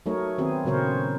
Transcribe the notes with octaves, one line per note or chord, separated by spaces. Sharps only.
F#3 A3 D#4 G#4 A#4 C#5
D#3 B3 C4 F#4 G#4
A#2 C#3 F#3 A#4 C5 C#5